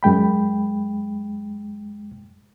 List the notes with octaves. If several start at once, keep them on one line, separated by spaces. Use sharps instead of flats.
F#2 G#3 G5 B5